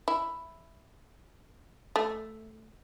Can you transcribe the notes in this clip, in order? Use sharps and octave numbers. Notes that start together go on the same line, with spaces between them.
E4
A3